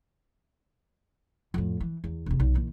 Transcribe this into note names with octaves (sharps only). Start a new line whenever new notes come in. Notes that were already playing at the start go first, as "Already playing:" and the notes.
F2 A2
E3
E2
E1 C3
B1
A#2 E3